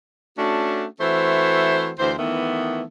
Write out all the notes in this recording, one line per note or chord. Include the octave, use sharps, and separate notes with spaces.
A3 C#4 D4 F#4
E3 A3 C4 F#4 C5
D2 E3 C5
D#3 E3 A3 B3